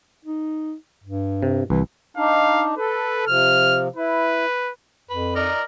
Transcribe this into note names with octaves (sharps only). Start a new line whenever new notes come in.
D#4
G2
C3
C2 E3
D4 D#4 F5
A4 B4
C3 F3 F6
E4 B4
F2 B4
A#4 D5 D#5 A#5